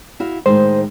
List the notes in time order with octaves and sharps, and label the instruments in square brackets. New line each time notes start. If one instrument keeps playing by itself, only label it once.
[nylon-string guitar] E4 F#4 F5
[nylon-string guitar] A2 D#3 G#3 [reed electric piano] C5